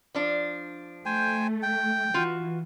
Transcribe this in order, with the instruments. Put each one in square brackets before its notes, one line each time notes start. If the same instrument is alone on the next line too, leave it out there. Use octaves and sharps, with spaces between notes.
[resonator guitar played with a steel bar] F3 D4
[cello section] A3 [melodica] C5 G5 G#5
[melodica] G5
[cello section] E3 [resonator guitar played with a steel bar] F4 F#4